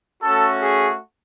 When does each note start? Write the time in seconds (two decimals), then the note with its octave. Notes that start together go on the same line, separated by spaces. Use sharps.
0.23 A3 C#4 F#4 A4
0.62 G#4